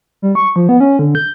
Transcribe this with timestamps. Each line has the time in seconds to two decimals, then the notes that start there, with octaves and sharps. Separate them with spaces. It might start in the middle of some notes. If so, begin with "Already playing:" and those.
0.22 G3
0.35 C#6
0.56 F3
0.69 B3
0.80 C#4
0.99 D3
1.15 G6